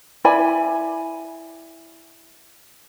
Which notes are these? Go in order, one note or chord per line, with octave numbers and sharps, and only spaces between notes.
E4 D5 G#5 B5